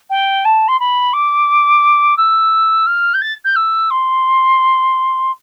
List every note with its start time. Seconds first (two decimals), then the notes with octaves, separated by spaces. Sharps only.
0.10 G5
0.45 A5
0.68 C6
0.80 B5
1.13 D6
2.17 E6
2.86 F6
3.14 G6
3.22 A6
3.45 G6
3.56 E6
3.90 C6